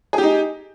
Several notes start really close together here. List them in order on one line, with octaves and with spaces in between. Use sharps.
G#4 G4 D#4